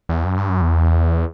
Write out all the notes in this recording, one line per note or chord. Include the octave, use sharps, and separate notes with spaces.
E2
F#2
G2
F#2
E2